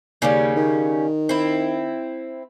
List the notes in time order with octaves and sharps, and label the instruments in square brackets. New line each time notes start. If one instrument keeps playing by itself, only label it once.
[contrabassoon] D#2 [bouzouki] C#3 G3 C#4
[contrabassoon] D#3
[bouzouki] C4 E4